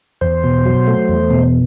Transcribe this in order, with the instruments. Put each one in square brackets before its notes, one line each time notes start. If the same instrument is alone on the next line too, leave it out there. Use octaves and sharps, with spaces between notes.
[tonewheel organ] E2 C5
B2
F#3
A3
E2
B2